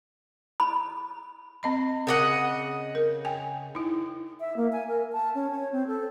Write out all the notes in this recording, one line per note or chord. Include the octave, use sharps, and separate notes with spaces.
B5
C4 D#5 B5
C#3 A#4 D#5 F#5 D6
A#4
G5 G#5
D#4 E4
E5
A#3
G#5
A#4
A5
C#4
C#5
C4
A4